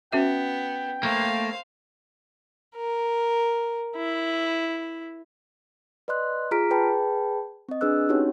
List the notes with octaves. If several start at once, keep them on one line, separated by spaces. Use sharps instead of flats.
B3 C#4 F#4 E5 G5
A3 A#3 C5 F5
A#4
E4
B4 D5 D#5 C6 F#6
F4 G#4 A#5 F6 B6 D7
G#4 B4 G5 A5 B5
C4 D#5
D4 G#4 B4 E6 F#6
C4 C#4 D#4 F#4 G4 C#5